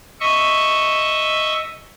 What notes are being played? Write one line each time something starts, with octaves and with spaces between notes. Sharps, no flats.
D#5 E5 C#6